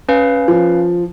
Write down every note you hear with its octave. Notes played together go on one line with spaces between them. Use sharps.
C#4 B4 F5
F3